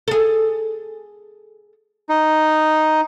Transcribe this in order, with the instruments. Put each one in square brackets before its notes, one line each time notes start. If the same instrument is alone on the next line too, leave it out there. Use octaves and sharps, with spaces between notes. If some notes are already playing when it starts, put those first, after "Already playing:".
[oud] G#4 A4
[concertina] D#4